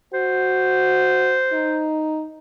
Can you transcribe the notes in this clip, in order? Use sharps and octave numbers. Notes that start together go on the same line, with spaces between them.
F#4 C5
D#4